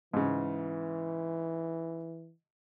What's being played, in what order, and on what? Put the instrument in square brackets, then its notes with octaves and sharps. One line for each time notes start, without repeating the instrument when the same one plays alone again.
[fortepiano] G#2 C#3 [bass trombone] E3